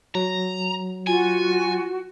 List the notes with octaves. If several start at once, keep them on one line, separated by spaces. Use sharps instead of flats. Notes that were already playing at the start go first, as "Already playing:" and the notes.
F#3 A#5
F4 F#4 G#5